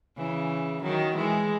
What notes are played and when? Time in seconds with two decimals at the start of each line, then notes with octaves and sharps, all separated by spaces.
0.17 C#3 E3
0.83 D#3 F#3
1.16 E3 G#3